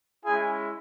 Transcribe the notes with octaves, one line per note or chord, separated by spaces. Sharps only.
G#3 C#4 E4 G#4 G#5